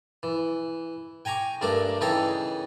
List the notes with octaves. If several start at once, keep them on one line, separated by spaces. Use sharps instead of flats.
E3
G5 G#5 A#5 C#6 D6
G2 A3 D4 A#4 D6
C#3 E3 D#4 A4 C#5 G5